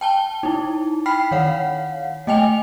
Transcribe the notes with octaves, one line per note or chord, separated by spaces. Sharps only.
G5 A5 G7
D#4 E4
G5 B5 F6 B6 C7
D#3 C#5 F5 F#5
A3 D#5 G5 G#5 F7